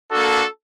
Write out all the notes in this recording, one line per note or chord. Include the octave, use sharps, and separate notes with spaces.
A#3 D4 F#4 A4